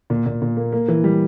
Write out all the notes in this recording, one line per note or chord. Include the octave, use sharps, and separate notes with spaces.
A#2
A#2
A#2
A#3
A#3
E3
G3